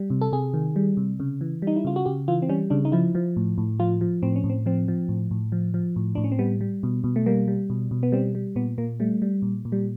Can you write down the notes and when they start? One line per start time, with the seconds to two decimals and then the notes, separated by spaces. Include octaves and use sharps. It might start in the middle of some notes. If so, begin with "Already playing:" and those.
Already playing: G3
0.10 C3
0.21 A4
0.32 C3 G#4
0.54 D#3
0.76 G3
0.97 C3
1.20 C#3
1.41 E3
1.62 G3 D#4
1.76 E4
1.85 C#3 F4
1.96 F#4
2.06 C#3 G4
2.28 E3 F4
2.42 C4
2.49 G3 C#4
2.70 C#3 D4
2.85 D#4
2.92 F3 E4
3.15 F3
3.37 A2
3.58 A2
3.80 F3 F4
4.01 F3
4.23 A2 C4
4.36 C#4
4.44 A2
4.49 C4
4.66 F3 C4
4.88 F3
5.09 A2
5.31 A2
5.52 F3
5.74 F3
5.96 A2
6.15 A2 D4
6.24 C#4
6.32 C4
6.39 G3 B3
6.61 G3
6.83 B2
7.04 B2
7.16 A3
7.26 G3 A#3
7.48 G3
7.70 B2
7.91 B2
8.03 B3
8.12 G3 C4
8.35 G3
8.56 A#2 B3
8.78 A#2 A#3
9.00 G3 A3
9.22 G3
9.42 A#2
9.65 A#2
9.72 G3